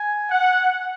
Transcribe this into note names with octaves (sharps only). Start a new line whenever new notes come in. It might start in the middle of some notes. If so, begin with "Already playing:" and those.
Already playing: G#5
F#5